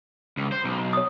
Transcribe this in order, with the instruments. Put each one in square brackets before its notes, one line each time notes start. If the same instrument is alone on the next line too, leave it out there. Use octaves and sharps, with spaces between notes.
[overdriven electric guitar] C#2
C5
B1
[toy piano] C#5 D#6